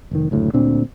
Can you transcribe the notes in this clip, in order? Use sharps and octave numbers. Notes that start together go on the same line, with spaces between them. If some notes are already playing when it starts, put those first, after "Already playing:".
F1 D#3
F#1 D2 A2
D2 A#2 C4 D4